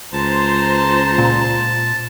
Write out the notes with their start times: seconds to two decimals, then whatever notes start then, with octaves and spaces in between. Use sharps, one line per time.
0.13 C#2 C5 A5 A#5 C6
1.18 A#2